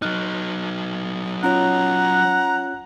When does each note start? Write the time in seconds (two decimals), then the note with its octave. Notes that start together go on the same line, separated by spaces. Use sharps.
0.02 F#3 D#4 F6 F#6
1.43 C#4 F4 C#5 F#5 A#5